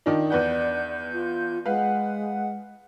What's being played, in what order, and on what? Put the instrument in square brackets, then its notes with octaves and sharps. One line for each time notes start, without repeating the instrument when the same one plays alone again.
[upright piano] D#3 D4 D#4 [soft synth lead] F4
[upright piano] E2 B4 F#5 [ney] D5 [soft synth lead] G6
[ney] F4
[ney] G#3 [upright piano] B4 F5 [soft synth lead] F#5